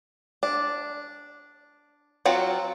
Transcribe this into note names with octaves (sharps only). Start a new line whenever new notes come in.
D4
F#3 C4 F4 F#4